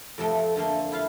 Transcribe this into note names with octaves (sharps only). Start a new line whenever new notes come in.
F2 C3 F3 A3 G5
D3 A3 A#3 C5
E4 F4 F5